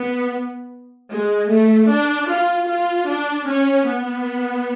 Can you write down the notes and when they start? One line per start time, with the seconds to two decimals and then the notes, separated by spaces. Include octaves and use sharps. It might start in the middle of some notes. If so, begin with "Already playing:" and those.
Already playing: B3
1.10 G#3
1.49 A3
1.89 D4
2.28 F4
2.68 F4
3.08 D4
3.47 C#4
3.86 B3